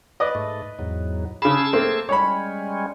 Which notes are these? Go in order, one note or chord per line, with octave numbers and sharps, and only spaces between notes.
B4 D5 D#5
G#2 A3
E2 G#2 F#3
C#3 G#4 A5 B5 E6
A3 A#3 C4
G3 G#3 C#4 C#5 B5